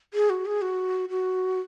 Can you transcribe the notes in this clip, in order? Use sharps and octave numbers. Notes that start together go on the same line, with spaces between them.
G#4
F#4
G#4
F#4
F#4